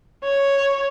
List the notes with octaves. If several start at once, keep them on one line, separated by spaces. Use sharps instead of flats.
C#5